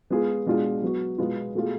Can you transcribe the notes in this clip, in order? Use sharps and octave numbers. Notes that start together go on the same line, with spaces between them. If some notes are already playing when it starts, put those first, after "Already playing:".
G#3 B3 F4 G#4
B2 G#3 D4 F4 G#4
F#3 B3 F#4
B2 G#3 B3 F4
B2 A3 F4 G#4